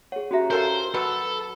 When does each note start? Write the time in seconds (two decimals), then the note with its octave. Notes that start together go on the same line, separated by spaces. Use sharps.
0.12 G#4 C#5 F#5
0.31 C#4 F#4 G4 E5 A#5
0.50 F4 A4 A#4 C5
0.94 F#3 A4 B4 F#5 B5